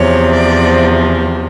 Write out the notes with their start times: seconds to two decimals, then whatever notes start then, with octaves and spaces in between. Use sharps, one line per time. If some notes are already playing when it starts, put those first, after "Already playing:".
Already playing: E2 C3 F3 C#5
0.34 D5